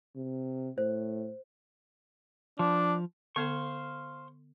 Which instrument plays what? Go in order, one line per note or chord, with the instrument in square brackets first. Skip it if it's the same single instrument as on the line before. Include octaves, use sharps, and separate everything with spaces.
[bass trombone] C3
[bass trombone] A2 [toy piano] C5
[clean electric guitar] F3 [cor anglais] D4
[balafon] D3 B3 A4 [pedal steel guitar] C5 F5 C#6